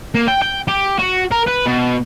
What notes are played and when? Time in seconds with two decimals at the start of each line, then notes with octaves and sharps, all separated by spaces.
0.15 A#3
0.28 G5
0.42 G5
0.68 G4
0.99 F#4
1.31 A#4
1.46 B4
1.66 B2